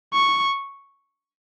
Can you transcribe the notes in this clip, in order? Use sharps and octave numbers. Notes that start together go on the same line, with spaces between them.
C#6